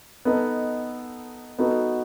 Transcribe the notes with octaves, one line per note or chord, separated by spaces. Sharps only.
B3 D#4 A4 D#5
B3 D#4 F#4 A4